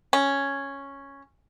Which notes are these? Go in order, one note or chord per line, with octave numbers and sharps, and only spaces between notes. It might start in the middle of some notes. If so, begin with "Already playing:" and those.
C#4